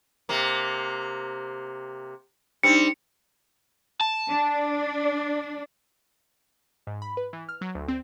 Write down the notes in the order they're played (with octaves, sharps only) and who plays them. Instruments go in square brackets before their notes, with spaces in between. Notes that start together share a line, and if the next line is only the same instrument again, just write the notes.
[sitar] C3 A#3
[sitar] G3 C4 [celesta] D4 D#4 [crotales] C#7
[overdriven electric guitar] A5
[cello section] D4
[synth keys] G#2
B5
B4
E3
F6
F#3
D2
C4